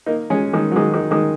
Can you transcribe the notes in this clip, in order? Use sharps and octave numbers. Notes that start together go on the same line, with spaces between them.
A#3 D#4
G#3 C#4
D#3 G#3
F#3
D#3 G#3
D#3
D#3 G#3